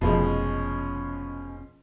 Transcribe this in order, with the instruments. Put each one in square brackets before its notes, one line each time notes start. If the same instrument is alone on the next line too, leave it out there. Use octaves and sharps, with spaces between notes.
[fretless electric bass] F1 [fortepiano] B2 F3 G#3 [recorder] C#4